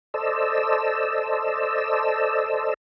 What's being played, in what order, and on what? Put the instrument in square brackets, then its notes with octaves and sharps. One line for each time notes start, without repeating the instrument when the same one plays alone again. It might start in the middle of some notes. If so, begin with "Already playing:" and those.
[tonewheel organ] A4 C5 D5 D#5 E6